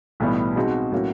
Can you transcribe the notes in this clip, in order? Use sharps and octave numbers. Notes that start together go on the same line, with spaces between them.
B1 A2 E3 G3 B3
B2 G#3 C4 D#4 F#4
A2 F#3 A#3 C#4 F#4